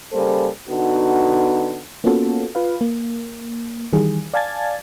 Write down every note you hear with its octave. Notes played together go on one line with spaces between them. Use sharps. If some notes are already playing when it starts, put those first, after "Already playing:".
C#3 G3 A#3 A4 C5
D3 B3 D#4 F#4
A#3 B3 C#4 F4 F#4 A4
F4 B4 F5
A#3
D#3 E3 G3 G#4
D5 F5 G#5 A5 G#6 A6